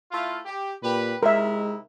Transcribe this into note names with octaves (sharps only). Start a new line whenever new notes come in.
A3 E4 F4
G4
A#2 G4 B4
C3 G#3 D#4 E4 A#4 E5